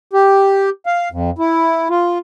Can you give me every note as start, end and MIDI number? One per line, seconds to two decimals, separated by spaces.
0.13 0.70 67
0.86 1.09 77
1.12 1.30 41
1.39 1.88 64
1.90 2.18 65